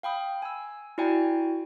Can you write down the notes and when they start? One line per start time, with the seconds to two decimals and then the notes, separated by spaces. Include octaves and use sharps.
0.03 F5 G5 B5 D#6
0.42 G#5 E6
0.98 E4 F#4 D5 G5 G#5 A#5